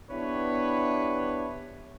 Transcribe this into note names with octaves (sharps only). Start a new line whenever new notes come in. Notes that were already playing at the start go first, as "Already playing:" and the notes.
B3 D4 E4 G4 B4 C#5